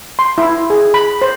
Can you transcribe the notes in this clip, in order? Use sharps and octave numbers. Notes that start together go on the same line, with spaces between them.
C6
E4
G#4
B5
C5